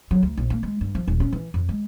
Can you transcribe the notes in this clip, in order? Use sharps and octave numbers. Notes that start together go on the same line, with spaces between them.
F#3
D2
A#1
A#3
G#3
G2
F3
D#1
C#4
E3
F2
G#3